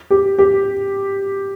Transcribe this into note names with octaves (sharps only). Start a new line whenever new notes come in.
G4
G4